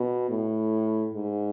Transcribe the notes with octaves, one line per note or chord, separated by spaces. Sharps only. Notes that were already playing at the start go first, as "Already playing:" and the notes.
Already playing: B2
A2
G#2